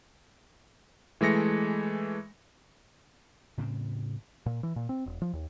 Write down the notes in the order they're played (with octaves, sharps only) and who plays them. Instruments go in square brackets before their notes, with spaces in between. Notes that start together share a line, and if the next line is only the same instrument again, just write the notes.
[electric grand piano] E3 G#3 A3 A#6 C#7
[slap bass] A2 C#3 C4
[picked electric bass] A#2
E3
A#2
C4
E1
F3
D#2